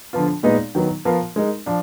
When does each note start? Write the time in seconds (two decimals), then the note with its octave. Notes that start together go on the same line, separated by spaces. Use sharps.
0.13 D3 F3 B3 F4
0.43 A#2 G#3 B3 D#4
0.75 D#3 F#3 B3
1.05 F3 B3 F4 A#4 F5
1.36 G#3 D#4 A#4
1.66 F3 D4